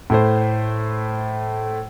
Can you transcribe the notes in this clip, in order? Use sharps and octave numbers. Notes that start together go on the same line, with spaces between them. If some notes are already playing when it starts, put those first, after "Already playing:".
A2 A3 C5